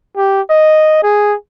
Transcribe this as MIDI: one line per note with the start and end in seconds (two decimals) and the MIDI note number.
0.17 0.41 67
0.50 0.99 75
1.03 1.35 68